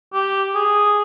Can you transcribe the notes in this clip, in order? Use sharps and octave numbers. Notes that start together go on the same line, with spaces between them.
G4
G#4